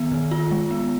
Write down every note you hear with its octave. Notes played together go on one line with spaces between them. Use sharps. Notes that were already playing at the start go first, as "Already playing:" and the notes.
Already playing: D#3 B3
D#3
F4
G#3
B3